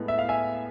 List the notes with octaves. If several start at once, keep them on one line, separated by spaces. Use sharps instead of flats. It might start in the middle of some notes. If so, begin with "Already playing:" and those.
Already playing: A2 G#3 B3
E5
F5
E5 G#5